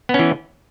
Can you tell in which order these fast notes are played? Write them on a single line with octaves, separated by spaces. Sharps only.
B3 C#4 E3